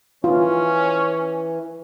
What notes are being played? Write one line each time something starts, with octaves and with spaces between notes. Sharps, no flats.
E3 C#4 F4